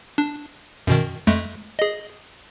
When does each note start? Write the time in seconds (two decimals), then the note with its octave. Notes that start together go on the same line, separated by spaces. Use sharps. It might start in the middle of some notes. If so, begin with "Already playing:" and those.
0.18 D4
0.87 F#2 B2 D#3
1.27 F2 G#3 A3
1.79 G#4 D#5